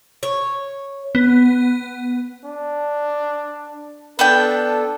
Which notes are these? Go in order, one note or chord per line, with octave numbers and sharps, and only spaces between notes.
C#5
B3
D4
B3 D4 A4 G5